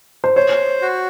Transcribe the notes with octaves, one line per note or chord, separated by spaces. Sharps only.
C5
C5 C#5
F#4